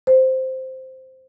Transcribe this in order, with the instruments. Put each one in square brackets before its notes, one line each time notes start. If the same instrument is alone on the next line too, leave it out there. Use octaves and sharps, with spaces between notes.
[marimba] C5